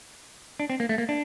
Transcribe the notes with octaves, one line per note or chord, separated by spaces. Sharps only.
D4
C4
A#3
A3
A#3
D4